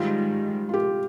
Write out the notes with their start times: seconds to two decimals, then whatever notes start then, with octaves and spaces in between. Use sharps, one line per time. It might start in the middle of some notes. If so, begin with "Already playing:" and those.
Already playing: G#2 D#3 G3 F4
0.69 F4
0.74 G4